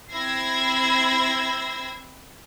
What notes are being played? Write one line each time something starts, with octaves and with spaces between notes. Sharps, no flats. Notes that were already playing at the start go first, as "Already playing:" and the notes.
C4 E4 E6 G#6 A#6 C7